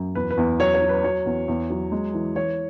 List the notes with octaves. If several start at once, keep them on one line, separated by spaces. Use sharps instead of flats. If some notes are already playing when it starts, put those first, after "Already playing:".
Already playing: F#2
E2 B4
B4
E2
F#3 C#5
C#5
F#3
B4
F#3 C#5
E2
E2
F#3
G#3
E3
E3 C#5